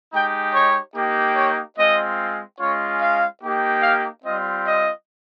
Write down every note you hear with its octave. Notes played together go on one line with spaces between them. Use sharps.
G#3 D#4 G4 G5
C#5
A#3 D#4 G4
C#5
G#3 C4 F4 D#5
G#3 C#4 F4 C#5
F5
A#3 D#4 G4
F5
G3 C4 F4 D#5
D#5